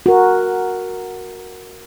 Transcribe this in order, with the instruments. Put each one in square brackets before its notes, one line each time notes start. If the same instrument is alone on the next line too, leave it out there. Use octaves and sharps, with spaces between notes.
[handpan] F#4 A#4